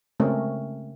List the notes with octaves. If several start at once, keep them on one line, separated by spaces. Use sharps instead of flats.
C#3 G#3 A3 C4 C#4 A#4